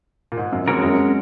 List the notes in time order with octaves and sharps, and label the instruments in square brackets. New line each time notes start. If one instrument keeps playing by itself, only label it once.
[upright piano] A#2
G#2
F#2
[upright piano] F2 [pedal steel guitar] G#3 C#4 F#4 A#4
[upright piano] F2
F#2